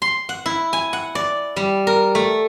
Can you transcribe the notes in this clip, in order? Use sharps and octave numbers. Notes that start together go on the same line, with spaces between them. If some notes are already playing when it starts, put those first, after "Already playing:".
C6
F#5
E4
G#5
F#5
D5
G3
A#4
A3